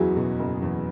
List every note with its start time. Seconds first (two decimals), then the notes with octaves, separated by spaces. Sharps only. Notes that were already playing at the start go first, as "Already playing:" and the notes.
Already playing: F#1 E2 F#3 E4 F#4 G#4
0.16 B2
0.39 F#1
0.62 E2